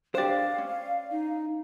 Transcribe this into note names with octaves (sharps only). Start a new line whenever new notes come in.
D4 G4 C5 D5 F5
C#4
D#4